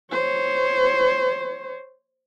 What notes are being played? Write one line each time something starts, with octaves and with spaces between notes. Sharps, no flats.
C5 C#5